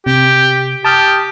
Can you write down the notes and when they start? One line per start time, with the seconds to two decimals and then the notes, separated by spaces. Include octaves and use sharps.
0.06 C3 G4
0.85 G4 A5 D#6 F6